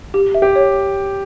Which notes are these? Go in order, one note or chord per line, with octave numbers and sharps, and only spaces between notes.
G4
E5
G4
C#5